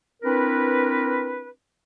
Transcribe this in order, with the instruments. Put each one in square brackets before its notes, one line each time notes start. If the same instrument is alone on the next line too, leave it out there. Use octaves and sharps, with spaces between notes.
[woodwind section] C4 D4 E4 A#4 B4